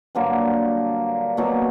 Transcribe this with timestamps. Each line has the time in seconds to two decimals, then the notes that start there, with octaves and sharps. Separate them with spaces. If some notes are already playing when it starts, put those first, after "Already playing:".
0.15 G2 D3 F#3 A#3
1.37 B2 F#3 A#3